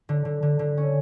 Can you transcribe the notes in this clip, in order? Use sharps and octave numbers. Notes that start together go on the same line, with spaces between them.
D3
D3
D3
D3
C#4